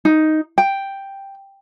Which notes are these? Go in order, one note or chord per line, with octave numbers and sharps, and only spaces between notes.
D#4
G5